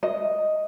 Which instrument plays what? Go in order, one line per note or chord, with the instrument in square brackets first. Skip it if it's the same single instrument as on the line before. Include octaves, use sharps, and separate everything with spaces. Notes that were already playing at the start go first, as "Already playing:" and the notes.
[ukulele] D#5